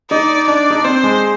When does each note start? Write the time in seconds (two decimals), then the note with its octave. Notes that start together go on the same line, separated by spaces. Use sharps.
0.10 D#4 D5
0.48 D4 D5
0.70 D#4
0.77 D4
0.85 C4 C5
1.04 G#3